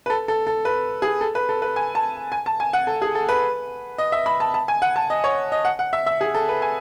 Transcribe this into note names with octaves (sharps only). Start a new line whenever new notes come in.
B4
A4
A4
A4
B4
G#4
A4
B4
A4
B4
G#5
A5
G#5
A5
G#5
F#5
A4
G#4
A4
B4
D#5
E5
B5
A5
A5
G#5
F#5
A5
D#5
C#5
D#5
F#5
F#5
E5
E5
G#4
A4
B4
G#5